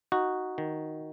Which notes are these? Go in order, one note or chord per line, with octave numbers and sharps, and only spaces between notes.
D#4 F#4
D#3